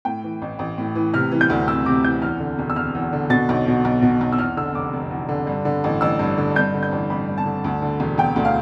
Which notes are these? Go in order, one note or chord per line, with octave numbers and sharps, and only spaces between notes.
A2 G5
E3
A1
A1
A2
E3
C3 F6
E3
G6
D2
D2 E6
C3 D6
E3 G6
E2 F6
D3
E1
E6
E1 F6
E2
D3
B2 A6
B1
B2
B1
B2
B1
E6
E2 F6
D3 E6
F1 D6
F1
E2
D3
G2
D3
A1
A1 E6
G2
D3
G2 G6
D3
G6
A1
A1 B5
G2
A5
D3
D2
D3
E1
E1 G5
D2
F5